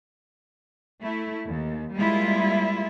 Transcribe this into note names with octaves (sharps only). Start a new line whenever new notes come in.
A3 E4
D#2
G3 G#3 A#3 E4 F4